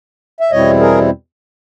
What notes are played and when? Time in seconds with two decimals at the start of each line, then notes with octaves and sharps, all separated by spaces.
0.40 E5
0.51 E2 B2 G3 C4 E4 C#5 D#5
0.80 G#4 A#4